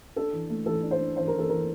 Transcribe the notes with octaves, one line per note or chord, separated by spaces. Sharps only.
D4 A4
E3
A3
E3 A4
D4
C5
D4
E3 C5
A#4
E3
A4
E3 A#4